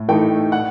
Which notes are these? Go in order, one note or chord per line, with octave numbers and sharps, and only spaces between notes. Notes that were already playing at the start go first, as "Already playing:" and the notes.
Already playing: A2
E3 A3 D#4 G5
F#5